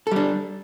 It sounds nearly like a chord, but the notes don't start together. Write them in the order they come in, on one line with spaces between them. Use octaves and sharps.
A4 G3 D4